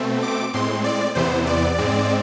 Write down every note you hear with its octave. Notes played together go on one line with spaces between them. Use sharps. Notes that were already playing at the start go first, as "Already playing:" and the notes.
Already playing: B2 A3 C4
D6
A2 G#3 C4 C6
D5
E2 C3 E3 B3 C5
D5
G#2 G#3 C4